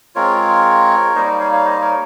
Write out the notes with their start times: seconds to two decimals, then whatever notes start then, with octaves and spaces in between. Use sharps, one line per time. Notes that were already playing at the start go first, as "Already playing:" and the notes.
0.15 G#3 C4 F4 A#4 C#5
1.15 G3 A#3 D#4 C5 D#5
1.40 C#5 F5
1.53 C#5 F5
1.65 C5 D#5
1.81 A#4 C#5